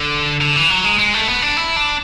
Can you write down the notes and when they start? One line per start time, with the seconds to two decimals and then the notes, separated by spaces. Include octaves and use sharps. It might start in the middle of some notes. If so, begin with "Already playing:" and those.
Already playing: D3
0.41 D3
0.56 E3
0.70 F#3
0.84 G#3
0.99 G#3
1.14 A3
1.28 B3
1.42 D4
1.57 E4
1.76 D4